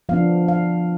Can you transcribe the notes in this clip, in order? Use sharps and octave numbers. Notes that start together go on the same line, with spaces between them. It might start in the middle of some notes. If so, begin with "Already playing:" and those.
F3 B3 D4 F5
F5